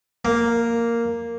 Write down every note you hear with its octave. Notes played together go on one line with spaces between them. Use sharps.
A#3